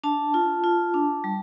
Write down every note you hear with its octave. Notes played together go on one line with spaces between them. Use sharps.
D4 A5
F4
F4
D4
G3